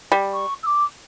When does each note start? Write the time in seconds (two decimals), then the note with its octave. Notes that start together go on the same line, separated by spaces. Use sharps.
0.12 G3
0.33 C#6
0.63 E6
0.66 D6